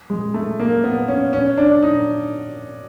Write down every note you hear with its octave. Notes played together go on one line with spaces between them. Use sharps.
G#3
A3
A#3
B3
C#4
C#4
D4
D#4